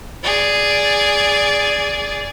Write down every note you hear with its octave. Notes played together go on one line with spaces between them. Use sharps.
G#4 D5